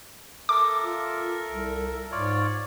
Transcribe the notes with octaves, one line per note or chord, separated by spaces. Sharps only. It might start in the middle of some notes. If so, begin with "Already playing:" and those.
A4 A#4 E5 D6
F4
C2
G#2 F4 C#5 D5